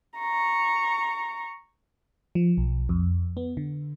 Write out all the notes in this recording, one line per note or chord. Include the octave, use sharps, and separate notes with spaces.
A#5 C#6
F3
B1
F2
B3
D3